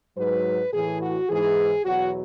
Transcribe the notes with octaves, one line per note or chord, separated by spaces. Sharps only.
G#2 F#3 B4
A2 E3 G#4
F#4
G#2 E3 G#4
E2 B2 F#3 F#4